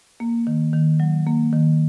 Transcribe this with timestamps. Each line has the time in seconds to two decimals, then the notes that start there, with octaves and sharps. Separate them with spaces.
0.20 A#3
0.47 D#3
0.73 D#3
1.00 F#3
1.27 A#3
1.53 D#3